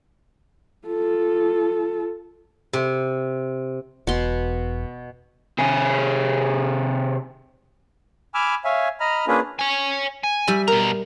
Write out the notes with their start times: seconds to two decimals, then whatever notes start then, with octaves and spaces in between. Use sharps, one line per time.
0.88 F4 A4
2.73 C3
4.07 E1 B2 C6
5.59 C3 G#4
8.34 G#5 B5 D6 E6 F6
8.64 C#5 E5 F5 G#5
9.00 D#5 A#5 B5 F6
9.28 A#3 C#4 D4 F4 G#4 B4
9.59 C#5 G#5
10.23 G#5
10.47 G3 E5 B5
10.68 B2 A#4 A#5